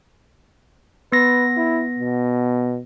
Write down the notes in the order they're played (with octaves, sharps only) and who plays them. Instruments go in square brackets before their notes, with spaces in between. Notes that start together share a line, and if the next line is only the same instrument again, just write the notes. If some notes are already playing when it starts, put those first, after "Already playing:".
[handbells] B3 A#6 [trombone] B4
[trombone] E4
B2